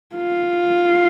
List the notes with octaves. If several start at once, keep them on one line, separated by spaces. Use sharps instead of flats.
F4